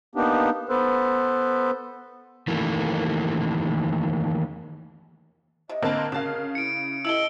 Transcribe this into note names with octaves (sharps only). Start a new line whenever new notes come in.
A#3 B3 D4 D#4 G4
B3 A4 B4 C5
D#3 E3 A3 A#3
C3 D#5
D3 A#3 C4 B4 A5
C#3 F#4 A#4 F5 A5
E4 C#7 D7
E4 G4 A4 D#5 E6 D7 G7